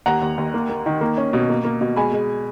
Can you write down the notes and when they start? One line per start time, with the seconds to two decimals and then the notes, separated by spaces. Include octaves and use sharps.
0.06 D#2 F#5 A#5
0.21 D#2
0.38 D#2
0.54 A#3
0.69 A#3
0.86 D#3
1.01 A#3
1.17 C#4
1.33 B2
1.49 A#3
1.65 A#3
1.81 B2
1.96 G#3 G#5 B5
2.12 G#3